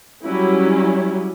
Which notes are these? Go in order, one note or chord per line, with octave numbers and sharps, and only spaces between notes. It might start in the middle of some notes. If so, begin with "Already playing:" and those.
F#3 G3 C#4 E4